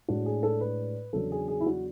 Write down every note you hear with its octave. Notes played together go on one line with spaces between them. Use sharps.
A2 G#3 D4 F#4
G#4
A4
B4
E2 C#3 F#3 B3 D4 A4
G#4
G#4
E4
F#4